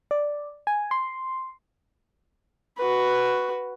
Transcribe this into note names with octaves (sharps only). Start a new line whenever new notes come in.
D5
G#5
C6
F#4 B4